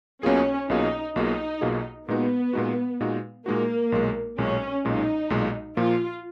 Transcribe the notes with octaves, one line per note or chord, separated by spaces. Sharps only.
B1 B2 A#3 C#4 F4 G#4
B1 B2 A#3 D#4 F4 G#4
B1 B2 A#3 D#4 F4 G#4
B1 B2 A#3 F4 G#4
A#2 G#3 B3 D#4 F#4
A#2 G#3 D#4 F#4
A#2 G#3 D#4 F#4
A#2 G#3 A#3 D#4 F#4
B1 A#2 G#3
B1 A#2 G#3 C#4
B1 A#2 G#3 D#4
B1 A#2 G#3
A#2 F3 A#3 F4